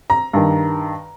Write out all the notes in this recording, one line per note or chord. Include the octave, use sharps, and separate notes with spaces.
A#5
G2 D#3